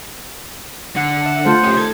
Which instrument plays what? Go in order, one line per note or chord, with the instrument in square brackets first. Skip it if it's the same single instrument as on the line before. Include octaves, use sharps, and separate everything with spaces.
[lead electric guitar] D3 [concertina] F#5
[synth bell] E5
[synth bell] A3 F4 A4 [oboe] C5
[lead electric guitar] C#4 G4 [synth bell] D#6
[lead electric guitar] D#3 A4 [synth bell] G#6